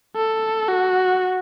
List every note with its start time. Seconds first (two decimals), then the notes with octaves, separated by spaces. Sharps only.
0.16 A4
0.68 F#4